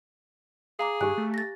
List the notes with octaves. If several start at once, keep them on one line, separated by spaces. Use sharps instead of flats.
G#4 F5 A#5 D6
G2 G4 G#5 F#6
A3
A6 A#6